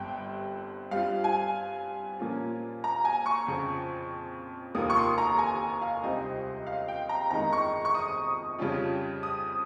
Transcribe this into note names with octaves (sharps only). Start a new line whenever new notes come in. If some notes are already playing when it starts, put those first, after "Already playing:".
Already playing: G1 G2 G3 C4 G5
G2 G3 C4 F4 F5
G#5
A#2 F3 A#3 C#4 F4
A#5
G#5
C#6
F2 C#3 F3 C4
F1 D#2 D#3 A#3 F4 D#6
C#6
C6
A#5
G#5
F5
C#2 C3 G3 C4 D#4 D#5
F5
G5
A#5
G1 F2 D#3 G#3 D#4 A#5
C#6
C#6
D#6
F2 C#3 G3 C#4 F4
D#6